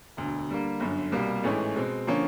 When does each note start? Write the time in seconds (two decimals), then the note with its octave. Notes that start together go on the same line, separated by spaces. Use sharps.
0.17 E1 D2 D3
0.49 D3 G3 A#3
0.80 G1 F#2 D3
1.12 C2 B2 G3 A#3
1.43 A1 G#2 E3 A3 C#4
1.76 B2 G#3 C4
2.07 D3 F3 A#3 C#4